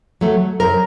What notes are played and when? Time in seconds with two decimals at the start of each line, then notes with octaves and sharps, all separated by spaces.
0.21 F#3 A3
0.60 F#2 A#4